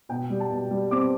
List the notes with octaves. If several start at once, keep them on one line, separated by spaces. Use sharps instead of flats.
B2 G5
G3
A5
B2
G3
C4 D6